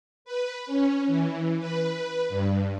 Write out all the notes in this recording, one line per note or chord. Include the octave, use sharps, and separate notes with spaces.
B4
C#4
E3
B4
G2